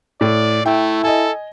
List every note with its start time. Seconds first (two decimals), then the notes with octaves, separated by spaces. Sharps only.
0.21 A2 D5
0.66 A3 E4 G5
1.04 A4 D#5 G#5